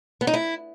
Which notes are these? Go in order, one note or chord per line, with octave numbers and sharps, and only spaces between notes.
B3
D#4
E4